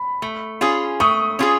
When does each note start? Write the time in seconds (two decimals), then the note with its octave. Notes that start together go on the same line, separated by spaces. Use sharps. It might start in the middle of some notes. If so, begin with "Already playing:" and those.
Already playing: B5
0.22 A3
0.61 C#4 F4 G#4
1.00 A3 C#6 D#6
1.39 C#4 F4 G#4